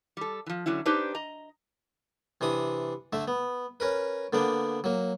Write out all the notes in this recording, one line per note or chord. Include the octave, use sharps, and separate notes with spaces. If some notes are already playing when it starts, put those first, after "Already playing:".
G3 A4
E3 F3
D3 F#3 C#4 E4
D4 D#4 G4 B4 C5
D#5 A#5
C3 E3 D4 D#6
D3 A3 E5
B3
C#4 A#4 B4
D3 A#3 B3 D4 G5
F#3 A#3